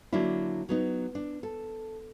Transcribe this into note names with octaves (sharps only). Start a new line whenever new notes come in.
D3 F#3 A#3 D4 E4
F#3 B3 D#4
D4
A4